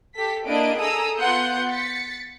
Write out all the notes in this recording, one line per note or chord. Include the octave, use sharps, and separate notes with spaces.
G4 A4 B6
A#3 D4 E4 D#5 D7
G#4 A4 A#5 D#6 E6
B3 F4 F#5 C6 G6 C#7
A6 B6 C#7